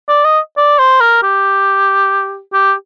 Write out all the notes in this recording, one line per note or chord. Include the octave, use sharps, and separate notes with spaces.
D5
D#5
D5
C5
A#4
G4
G4